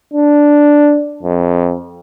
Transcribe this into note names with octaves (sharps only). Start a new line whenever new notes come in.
D4
F2